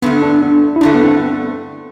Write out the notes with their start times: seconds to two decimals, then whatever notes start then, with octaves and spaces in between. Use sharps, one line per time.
0.02 G2 D3 A3 B3
0.22 D4
0.42 D4
0.76 E4
0.81 G2 D3 A3 D4
0.94 B3
1.03 C4